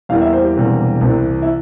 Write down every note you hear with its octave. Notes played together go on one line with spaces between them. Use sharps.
E2 E3 G3 A#3 F5
E5
C5
G4
E1 E2 C3 G3 A#3
C2 C3 E3
E4